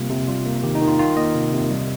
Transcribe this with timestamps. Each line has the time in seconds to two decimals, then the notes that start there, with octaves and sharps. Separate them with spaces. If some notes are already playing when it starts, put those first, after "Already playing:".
Already playing: C3 G3 A#3 F4
0.10 C3
0.28 G3 F4
0.45 A#3
0.63 D#3 G4
0.75 D#4
0.81 D#3
0.87 F4
0.99 D#3 F4
1.17 A#3 D#5
1.35 C3
1.53 C3
1.70 G3